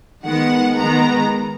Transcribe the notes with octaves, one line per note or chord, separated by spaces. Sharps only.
D#3 G#3 B3 F#5
D#3 G#3 B3 A#5